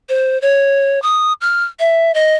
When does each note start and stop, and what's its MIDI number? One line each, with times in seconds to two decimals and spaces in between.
0.09 0.40 72
0.42 1.01 73
1.02 1.33 87
1.41 1.65 89
1.80 2.12 76
2.15 2.36 75